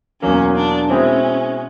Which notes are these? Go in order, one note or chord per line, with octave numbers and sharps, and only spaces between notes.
E2 B2 F#3 A#3 C#4
D4
B2 G#3 C4 C#4 E4